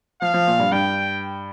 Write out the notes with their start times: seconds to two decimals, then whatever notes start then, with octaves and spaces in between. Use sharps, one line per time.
0.22 F3 F5
0.34 F3
0.47 A#2
0.59 G2
0.72 G2 G5